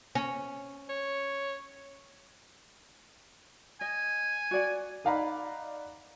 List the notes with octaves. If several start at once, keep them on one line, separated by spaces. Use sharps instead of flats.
C#4
C#5
D#5 G#5
F#4 D5 F#5
D#4 D5 F5 F#5 A#5 B5